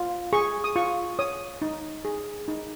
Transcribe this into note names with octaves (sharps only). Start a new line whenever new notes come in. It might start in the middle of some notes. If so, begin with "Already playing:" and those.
Already playing: F4
G#4 C#6
D#6
F4 C#6
C#5 D#6
D#4
G#4
D#4